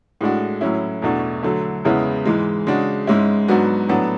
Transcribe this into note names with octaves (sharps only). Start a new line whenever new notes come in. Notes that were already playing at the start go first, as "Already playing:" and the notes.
A2 G#3 D4 F#4
A2 F#3 C#4 E4
E2 B2 A3 D4 F#4
D3 F#3 A3
E2 C#3 G#3 B3 E4
G#2 E3 G#3
C#3 G#3 D4 F#4
G#2 G#3 C#4 E4
G#2 F#3 B3 D4 F#4
A2 F#3 B3 D4